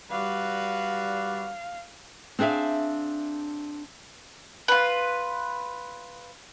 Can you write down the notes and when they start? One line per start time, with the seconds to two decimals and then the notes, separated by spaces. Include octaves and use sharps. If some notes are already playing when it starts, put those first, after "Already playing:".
0.11 G3 F#4 B4 D5 F5
2.39 C4 D4 G#4 E5 F5
4.68 F4 B4